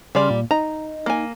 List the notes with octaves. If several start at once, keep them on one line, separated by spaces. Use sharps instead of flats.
C#3 G3 D5 C6 F6
A#2
D#4 A#5
A#3 G#5